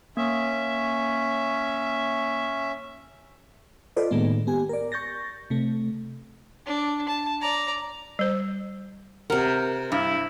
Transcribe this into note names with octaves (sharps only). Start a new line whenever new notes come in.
A#3 C#4 E5
F4 A4 B4 C5 D5 D#5
A2 D#3 G#3 A#3 B3
B3 G4 G#5
A#4 D5
C#6 G6 A6 A#6
C3 A3
D4
A5
D5 A#5
G3 C5
C3 A#4 F#5
G2 E4